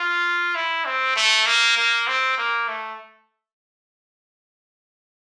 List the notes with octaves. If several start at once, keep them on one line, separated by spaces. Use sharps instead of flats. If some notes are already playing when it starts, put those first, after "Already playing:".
Already playing: F4
E4
C4
A3
A#3
A#3
C4
A#3
A3